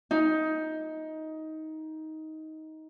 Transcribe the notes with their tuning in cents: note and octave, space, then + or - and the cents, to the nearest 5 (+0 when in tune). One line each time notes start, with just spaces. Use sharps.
D#4 +15